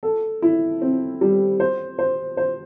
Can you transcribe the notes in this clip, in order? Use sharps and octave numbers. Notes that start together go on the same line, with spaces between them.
A4
E4
C4
G3
C5
C5
C5